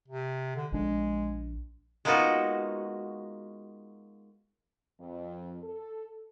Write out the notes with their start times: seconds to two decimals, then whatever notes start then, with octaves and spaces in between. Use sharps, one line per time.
0.08 C3
0.56 D3
0.72 A#1 G#3 D4
2.05 G#3 A#3 B3 D#4 F4 F#4
5.00 F2
5.62 A4